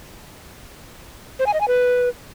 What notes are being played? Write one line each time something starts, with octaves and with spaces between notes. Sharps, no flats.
C5
G#5
D#5
G#5
B4